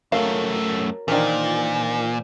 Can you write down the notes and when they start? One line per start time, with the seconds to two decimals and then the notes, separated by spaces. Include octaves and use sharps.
0.12 F#2 A3 F#4 A#4 C#5 F5
1.08 A#2 D#3 E3 D4 A#4 C5 D5